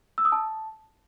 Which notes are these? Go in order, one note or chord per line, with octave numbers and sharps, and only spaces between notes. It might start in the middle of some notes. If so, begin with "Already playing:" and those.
E6
D#6
A5